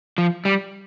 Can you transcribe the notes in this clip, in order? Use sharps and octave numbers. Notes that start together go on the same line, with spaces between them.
F3
G3